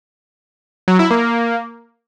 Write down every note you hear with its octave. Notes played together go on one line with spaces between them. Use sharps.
F#3
E4
A#3